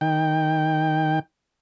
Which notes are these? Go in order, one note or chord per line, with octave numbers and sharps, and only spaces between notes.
D#3 G5